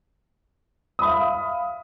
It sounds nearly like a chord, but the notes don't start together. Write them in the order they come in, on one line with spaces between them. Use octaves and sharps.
D#6 B5 E5 F5